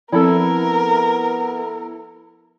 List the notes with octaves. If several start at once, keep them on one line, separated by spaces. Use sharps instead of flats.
F3 B3 C4 E4 A4 A#4